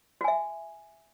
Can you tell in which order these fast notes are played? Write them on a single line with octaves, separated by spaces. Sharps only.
F#4 G#5 E5